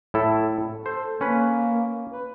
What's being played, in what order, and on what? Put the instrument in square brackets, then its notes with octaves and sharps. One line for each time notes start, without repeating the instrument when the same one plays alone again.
[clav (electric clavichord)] A2 E4 A4
[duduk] A4 [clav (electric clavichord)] C5
[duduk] A#3 [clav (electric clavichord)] C#4 B4
[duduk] B4